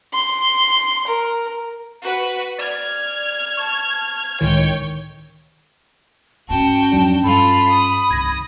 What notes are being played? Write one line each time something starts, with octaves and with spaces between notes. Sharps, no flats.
C6
A#4
F#4 B4
D5 F6 G#6
A5 C#6
C#2 A2 D#3 C#5 G5
G#2 C#4 F#4 G5 A5
F2 F#3 D4
G2 F4 A4 B5
D#6
C2 D#3 G#6 A#6